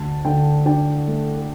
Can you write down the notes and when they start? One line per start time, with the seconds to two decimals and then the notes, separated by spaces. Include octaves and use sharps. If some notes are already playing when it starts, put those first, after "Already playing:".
Already playing: D2 A5
0.25 D3 G5
0.66 D4 G5
1.07 A3
1.36 A4